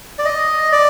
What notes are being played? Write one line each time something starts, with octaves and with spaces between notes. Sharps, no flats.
D5
D#5
D5